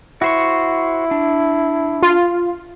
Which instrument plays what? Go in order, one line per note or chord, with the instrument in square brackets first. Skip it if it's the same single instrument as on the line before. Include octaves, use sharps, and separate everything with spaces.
[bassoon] E4 [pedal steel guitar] F#4 C5 C#6
[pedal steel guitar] D4
[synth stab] F4